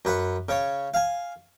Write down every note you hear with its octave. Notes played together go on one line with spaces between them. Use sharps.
F#2 B4 F#5
C#3 C#5
F5 G#5